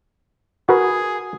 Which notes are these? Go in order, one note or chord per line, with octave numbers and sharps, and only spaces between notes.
F#4 G#4 A#4 B4